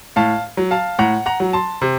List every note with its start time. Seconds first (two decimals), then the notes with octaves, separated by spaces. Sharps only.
0.16 A2 F5 A5
0.57 F#3
0.71 F5 A5
0.99 A2 F#5 A#5
1.26 F#5 A#5
1.40 F#3
1.53 A5 C6
1.82 C3